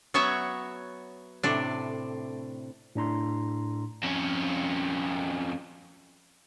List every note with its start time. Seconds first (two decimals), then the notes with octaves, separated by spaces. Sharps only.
0.14 F#3 B3 F#4 C#5 E5
1.43 A2 C3 D4
2.96 A2 D4 A#5 C6
4.04 F2 C#4